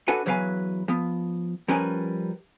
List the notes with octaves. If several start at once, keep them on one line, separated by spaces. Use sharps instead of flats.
D4 F#4 A4 B4 G#5
E2 F#3 A#4 B4 F5 G#5
F3 B3
F3 G3 C#4 A#4 B4 G#5